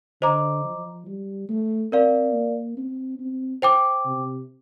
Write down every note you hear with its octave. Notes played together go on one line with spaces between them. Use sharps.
D3 C5 D#5 A#5 D6
F3
G3
A3
C4 A#4 D5 F5
A#3
C4
C4
C5 G5 D6
C3